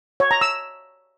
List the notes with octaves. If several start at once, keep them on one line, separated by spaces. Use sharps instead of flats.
C#5
A#5
E6